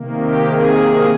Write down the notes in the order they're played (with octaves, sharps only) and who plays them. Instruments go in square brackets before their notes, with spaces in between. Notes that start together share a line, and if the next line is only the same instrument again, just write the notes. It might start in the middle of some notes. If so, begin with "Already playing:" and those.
Already playing: [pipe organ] C3 D#3 A#3
G4
G#4